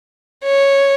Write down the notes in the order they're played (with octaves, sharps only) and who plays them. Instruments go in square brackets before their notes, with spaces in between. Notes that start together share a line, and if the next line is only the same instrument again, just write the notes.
[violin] C#5